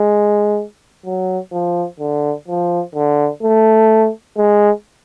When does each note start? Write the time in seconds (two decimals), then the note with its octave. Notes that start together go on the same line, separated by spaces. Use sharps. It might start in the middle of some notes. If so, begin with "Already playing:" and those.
Already playing: G#3
1.05 F#3
1.52 F3
2.00 D3
2.48 F3
2.95 D3
3.43 A3
4.37 G#3